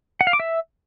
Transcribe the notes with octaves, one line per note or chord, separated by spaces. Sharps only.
F#5
F5
D6
E5